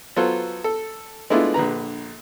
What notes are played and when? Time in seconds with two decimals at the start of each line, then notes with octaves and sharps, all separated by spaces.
0.16 F#3 B3 F4 A4 C5
0.64 A4
1.30 G#3 A3 B3 D4 E4 F4
1.54 A#1 D3 B4 A#5